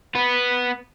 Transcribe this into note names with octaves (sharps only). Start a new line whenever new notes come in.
B3 B4